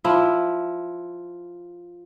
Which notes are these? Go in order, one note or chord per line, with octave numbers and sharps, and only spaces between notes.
F3 E4